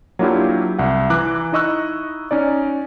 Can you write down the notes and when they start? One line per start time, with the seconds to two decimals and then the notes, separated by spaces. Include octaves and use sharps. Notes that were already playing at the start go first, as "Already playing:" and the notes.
0.19 F#3 A#3 D4 E4 F4 G4
0.79 C2 F#5
1.10 E3 A#5 D6 F#6
1.52 D#4 E4 D#5 C#6 E6 F#6
2.31 C#4 D#4 D5